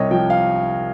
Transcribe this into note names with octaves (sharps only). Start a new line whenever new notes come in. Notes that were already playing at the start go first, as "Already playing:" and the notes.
Already playing: C2 C3 C#5 D#5
F3 G5
F5